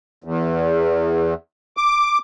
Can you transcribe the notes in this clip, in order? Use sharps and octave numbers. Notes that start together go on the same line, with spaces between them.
E2
D6